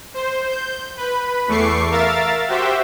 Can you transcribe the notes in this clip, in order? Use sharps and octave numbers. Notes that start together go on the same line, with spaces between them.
C5
G6
B4 B5
E2 A3 C#6 D6 C7
A#4 E5 F5 A6
F#4 G4 C5 E5